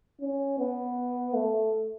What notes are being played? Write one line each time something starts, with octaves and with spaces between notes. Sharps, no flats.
C#4
B3
A3